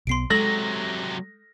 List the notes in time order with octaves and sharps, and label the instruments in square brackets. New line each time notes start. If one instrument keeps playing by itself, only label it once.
[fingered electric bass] B1 B3 [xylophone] C6 C7 D7
[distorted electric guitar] C3 F#3 [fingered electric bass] G#3 [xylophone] A4 [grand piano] A#6